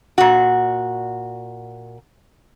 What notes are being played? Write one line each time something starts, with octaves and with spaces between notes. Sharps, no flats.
A#2 F#4